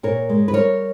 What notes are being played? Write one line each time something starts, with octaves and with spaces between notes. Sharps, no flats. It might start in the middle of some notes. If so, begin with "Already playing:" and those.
A#2 A#4 C#5
G#3
B4
G3 A#4 C#5